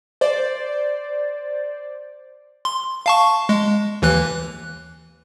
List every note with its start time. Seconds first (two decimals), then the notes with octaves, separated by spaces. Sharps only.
0.21 C5 D5
2.65 C6
3.06 F5 A5 C#6
3.49 G#3
4.02 D#2 E3 F#6